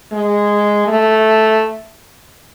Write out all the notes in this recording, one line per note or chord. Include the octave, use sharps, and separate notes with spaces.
G#3
A3